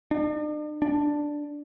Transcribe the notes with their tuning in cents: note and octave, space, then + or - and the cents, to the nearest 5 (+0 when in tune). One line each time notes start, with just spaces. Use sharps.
D4 +45
D4 +0